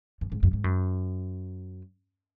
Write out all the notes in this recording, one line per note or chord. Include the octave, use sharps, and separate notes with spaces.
F#2
G#2
F#2
G#2
F#2